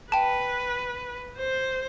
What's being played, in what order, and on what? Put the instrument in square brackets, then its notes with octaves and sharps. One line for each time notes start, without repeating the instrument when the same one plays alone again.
[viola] B4 [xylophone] G5 A5
[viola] C5